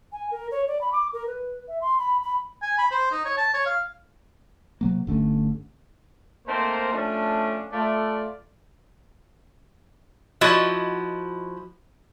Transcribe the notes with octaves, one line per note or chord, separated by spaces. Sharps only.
G#5
A#4
C#5
D5
B5
D6
A#4
B4
E5
C6
B5
B5
G#5
B5
C5
D#4
C#5
A5
C#5
F5
C3 F#3 A#3
G1 D3 A3 C#4
A3 A#3 C4 D#4 A#4 C5
F3 A3 C#4 D4
A3 F4 D5
F3 E4 F#4 D#5